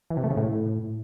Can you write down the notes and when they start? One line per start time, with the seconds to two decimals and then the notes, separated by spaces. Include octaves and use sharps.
0.10 E3
0.17 C3
0.24 A3
0.30 C#3
0.37 A2